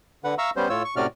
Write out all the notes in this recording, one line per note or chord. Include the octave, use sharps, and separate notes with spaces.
D3 B4 F#5
E5 F5 A#5 C#6 E6
G3 B3 C#4 C5
A2 F4 C#5 E6
C#6
A2 C3 C#4 F#4 D5 F6